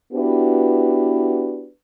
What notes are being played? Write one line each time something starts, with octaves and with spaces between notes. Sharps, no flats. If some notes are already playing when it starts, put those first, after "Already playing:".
B3 D4 E4 F#4 G4 B4